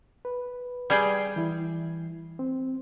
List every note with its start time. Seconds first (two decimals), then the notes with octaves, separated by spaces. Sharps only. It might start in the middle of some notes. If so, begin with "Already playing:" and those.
0.25 B4
0.90 G3 G#4 G5
1.36 E3 E4
2.39 C4